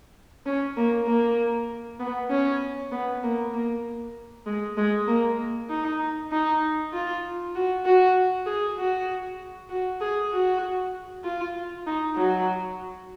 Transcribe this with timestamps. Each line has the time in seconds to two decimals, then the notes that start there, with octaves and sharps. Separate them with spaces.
0.46 C#4
0.77 A#3
1.07 A#3
1.99 B3
2.30 C#4
2.91 B3
3.23 A#3
3.54 A#3
4.46 G#3
4.77 G#3
5.08 A#3
5.70 D#4
6.32 D#4
6.93 F4
7.55 F#4
7.85 F#4
8.46 G#4
8.78 F#4
9.69 F#4
10.01 G#4
10.32 F#4
11.24 F4
11.86 D#4
12.16 F#3